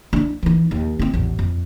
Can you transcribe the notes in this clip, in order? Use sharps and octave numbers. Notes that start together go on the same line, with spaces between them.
D4 E4
E3 D#4
D#2
C4 E4
A1 E2
F2